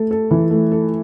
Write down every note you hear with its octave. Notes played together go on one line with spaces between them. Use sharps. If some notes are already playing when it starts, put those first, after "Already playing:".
Already playing: A3 A4
A4
E3
A3
A4